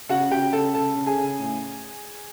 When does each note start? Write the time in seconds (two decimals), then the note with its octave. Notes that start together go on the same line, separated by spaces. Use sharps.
0.09 C#3 F#4 F#5
0.31 C#3 G4 G5
0.53 C#3 A4 A5
0.74 C#3 A4 A5
0.96 C#3
1.06 G#4 G#5
1.18 C#3
1.39 A2